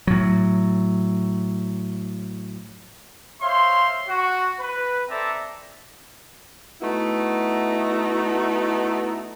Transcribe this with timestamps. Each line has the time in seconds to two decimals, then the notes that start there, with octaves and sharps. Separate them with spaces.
0.07 A2 F#3
3.41 C5 C#5 E5 F5 C6
4.08 F#4
4.59 B4
5.08 C4 A4 D5 E5 A5 A#5
6.81 A3 B3 D#4 E4 F#4